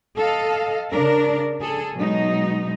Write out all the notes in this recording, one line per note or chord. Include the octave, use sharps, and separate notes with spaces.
A4 D#5 F5
C#3 D4 A#4
G#4 A4
B2 F#3 G#3 D#4